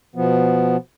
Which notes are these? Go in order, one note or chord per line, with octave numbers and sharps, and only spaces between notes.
B2 F3 B3